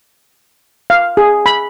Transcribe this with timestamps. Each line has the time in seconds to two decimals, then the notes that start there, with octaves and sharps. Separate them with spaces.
0.90 F5
1.17 G#4
1.46 B5